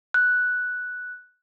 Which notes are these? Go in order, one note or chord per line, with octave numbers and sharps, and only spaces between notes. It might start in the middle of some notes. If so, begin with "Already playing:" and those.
F#6